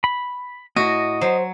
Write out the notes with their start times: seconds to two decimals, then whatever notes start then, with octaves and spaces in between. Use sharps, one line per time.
0.04 B5
0.76 A2 E4 F#4 D#5
1.21 F#3 C5